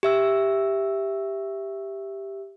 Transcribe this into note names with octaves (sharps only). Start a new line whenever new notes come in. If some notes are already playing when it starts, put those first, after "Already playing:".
G4 E5 E6